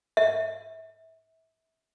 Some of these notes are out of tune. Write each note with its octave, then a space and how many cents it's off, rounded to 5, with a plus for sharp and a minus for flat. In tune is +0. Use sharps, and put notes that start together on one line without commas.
E5 -25